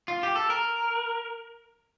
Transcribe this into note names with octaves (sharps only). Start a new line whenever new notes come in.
F4
G4
A4
A#4